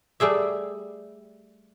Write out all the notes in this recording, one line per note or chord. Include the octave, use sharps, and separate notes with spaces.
G3 A3 G#4 E5